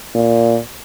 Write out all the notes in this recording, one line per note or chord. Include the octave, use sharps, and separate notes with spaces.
A#2